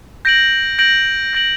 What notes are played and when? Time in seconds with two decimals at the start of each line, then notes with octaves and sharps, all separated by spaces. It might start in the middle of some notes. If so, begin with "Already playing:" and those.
0.25 G6 A#6 D7 F#7
0.79 G6 A#6 D7 F#7
1.33 G6 A#6 D7 F#7